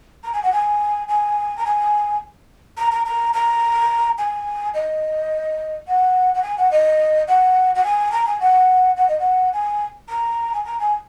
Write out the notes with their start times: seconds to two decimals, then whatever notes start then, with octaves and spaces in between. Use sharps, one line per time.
0.24 A#5
0.33 G#5
0.43 F#5
0.52 G#5
1.08 G#5
1.57 A#5
1.65 G#5
2.78 A#5
2.92 A#5
3.06 A#5
3.34 A#5
4.18 G#5
4.74 D#5
5.88 F#5
6.35 F#5
6.43 G#5
6.58 F#5
6.71 D#5
7.28 F#5
7.75 F#5
7.84 G#5
8.12 A#5
8.27 G#5
8.40 F#5
8.97 F#5
9.08 D#5
9.19 F#5
9.53 G#5
10.09 A#5
10.54 G#5
10.65 A#5
10.80 G#5